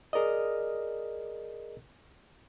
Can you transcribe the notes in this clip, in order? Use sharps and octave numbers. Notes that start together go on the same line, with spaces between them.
G#4 A#4 D5 D#5